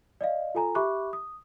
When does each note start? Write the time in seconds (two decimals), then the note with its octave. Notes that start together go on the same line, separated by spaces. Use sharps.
0.21 D5 D#5 F5
0.55 F4 A4 G#5 A#5
0.75 G4 E5 B5 C#6 D6 F#6
1.13 D#6